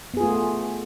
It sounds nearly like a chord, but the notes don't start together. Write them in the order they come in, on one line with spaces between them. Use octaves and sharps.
B3 G#4 F4 A3